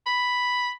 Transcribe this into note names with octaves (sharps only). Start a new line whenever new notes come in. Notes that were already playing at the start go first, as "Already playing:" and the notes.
B5